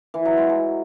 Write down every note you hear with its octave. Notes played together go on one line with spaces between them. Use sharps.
E3
F#3
G#3
F#3